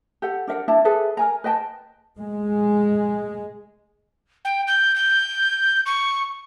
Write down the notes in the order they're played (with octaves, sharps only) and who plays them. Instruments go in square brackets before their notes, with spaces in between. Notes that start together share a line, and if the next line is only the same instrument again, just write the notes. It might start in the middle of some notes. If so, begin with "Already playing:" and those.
[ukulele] G4 A4 F#5
D4 A#4 E5 F#5
D4 E4 E5 A5
G#4 A4 B4 E5
A#4 G#5 A#5
B4 D#5 G5 A5
[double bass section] G#3
[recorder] G5
G6
G6
C#6